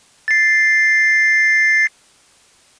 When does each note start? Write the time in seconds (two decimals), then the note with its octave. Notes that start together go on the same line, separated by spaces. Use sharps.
0.28 A6 C7